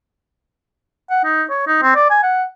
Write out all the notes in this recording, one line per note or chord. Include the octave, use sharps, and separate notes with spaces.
F#5
D#4
C#5
D#4
C4
D5
G#5
F#5